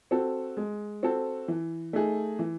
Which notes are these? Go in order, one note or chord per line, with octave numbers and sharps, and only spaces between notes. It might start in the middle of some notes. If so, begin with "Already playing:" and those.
C4 F#4 A4
G#3
C4 F#4 A4
E3
A3 D#4 G#4
E3